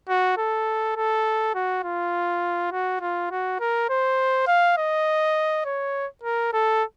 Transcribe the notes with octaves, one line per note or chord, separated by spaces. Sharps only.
F#4
A4
A4
F#4
F4
F#4
F4
F#4
A#4
C5
F5
D#5
C#5
A#4
A4